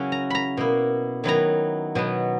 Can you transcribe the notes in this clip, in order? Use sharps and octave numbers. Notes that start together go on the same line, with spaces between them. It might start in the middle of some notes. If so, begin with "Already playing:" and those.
Already playing: C#3 F#3 C#4 E4 F#5
A#5
A#5 B5
B2 A#3 E4
D#3 F#3 B3 E4 A#5
B2 F#3 B3